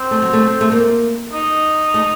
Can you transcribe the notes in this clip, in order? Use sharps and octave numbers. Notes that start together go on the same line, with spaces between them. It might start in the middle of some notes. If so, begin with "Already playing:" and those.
Already playing: C4
A3
F#3
A3
A3
A#3
D#4
A3